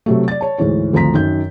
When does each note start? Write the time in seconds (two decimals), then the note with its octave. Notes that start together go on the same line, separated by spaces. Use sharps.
0.06 C3 F#3 A3
0.28 D5 A6
0.41 C#5 A5
0.58 D2 G#2 E3 C#5
0.93 G#1 D2 F3 A#5 B6
1.14 F#2 D#3 G6